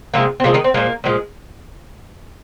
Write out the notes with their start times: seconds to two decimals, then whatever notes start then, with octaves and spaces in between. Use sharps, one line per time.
0.14 C3 F3 G#3 A#3
0.40 C4
0.44 C3 F3 G#3 A#3
0.54 D#3 D#4
0.64 C4
0.74 A#2 F3 G#3 A#3
1.04 A#2 F3 G#3